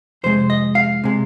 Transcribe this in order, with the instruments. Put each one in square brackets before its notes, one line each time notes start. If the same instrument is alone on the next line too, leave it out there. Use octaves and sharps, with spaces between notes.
[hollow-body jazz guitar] F2 C3 G#3 C5
D#5
F5
C3 G#3